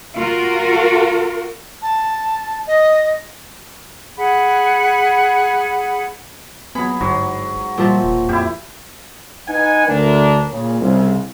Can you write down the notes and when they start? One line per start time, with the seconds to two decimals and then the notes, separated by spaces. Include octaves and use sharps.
0.16 F4 F#4 A#4
1.82 A5
2.67 D#5
4.18 G#4 F#5 B5
6.75 F#3 B3 G#4 B5
7.01 G1 G#2 F#3
7.78 A#2 F3 G3 E5
8.04 E1
8.29 F2 E4 G4
9.48 D#4 B4 F#5 G#5
9.87 D2 D4 A#4
10.50 A#2 C#3
10.81 C2 C#3